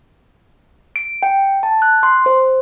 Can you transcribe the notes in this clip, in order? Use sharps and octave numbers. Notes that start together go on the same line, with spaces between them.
D7
G5
A5
F#6
C6
C5